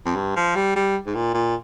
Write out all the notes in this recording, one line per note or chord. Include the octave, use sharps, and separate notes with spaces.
F2
G2
F3
G3
G3
G#2
A#2
A#2